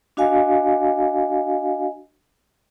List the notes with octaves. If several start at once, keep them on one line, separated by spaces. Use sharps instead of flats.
D4 F#4 D#5 F5 G#5